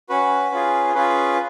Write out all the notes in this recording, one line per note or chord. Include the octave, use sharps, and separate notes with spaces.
C#4 F#4 B4
C#4 F4 G#4
C#4 F4 G#4 B4